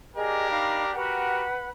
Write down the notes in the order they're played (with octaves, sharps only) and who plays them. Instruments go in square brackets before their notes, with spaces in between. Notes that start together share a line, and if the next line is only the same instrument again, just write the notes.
[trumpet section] D4 G4 A#4 [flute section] G#4 D#5
[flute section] D#4 F5 B5
[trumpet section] F#4 G4 A#4 [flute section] B4 F#5 B5